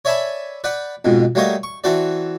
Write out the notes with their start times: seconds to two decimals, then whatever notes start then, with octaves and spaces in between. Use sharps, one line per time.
0.05 C#5 D5 E5 G#5 A5 B5
0.64 B4 D5 F#5 G5
1.05 F2 G#2 B2
1.35 F#3 G3 A3 A#3 C#5 D#5
1.63 C#6
1.84 E3 C4 F#4 A4 D5